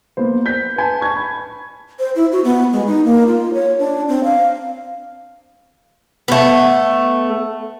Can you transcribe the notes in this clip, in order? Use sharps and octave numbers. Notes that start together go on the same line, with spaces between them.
A#3 B3 C5
G6 B6
B4 G#5 A5
C#6 G#6
B5
C5
E4
F#4
B3
G#3
D#4
A#3
F4
C#5
D4
C4
F5
A3 B3